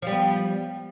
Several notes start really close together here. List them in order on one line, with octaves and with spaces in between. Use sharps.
F3 G3 B3